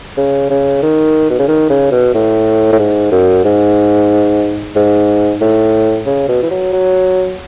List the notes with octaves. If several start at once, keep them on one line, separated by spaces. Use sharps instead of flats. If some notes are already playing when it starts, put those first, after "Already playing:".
C#3
C#3
D#3
B2
C#3
D#3
C#3
B2
A2
A2
G#2
F#2
G#2
G#2
A2
C#3
B2
E3
F#3
F#3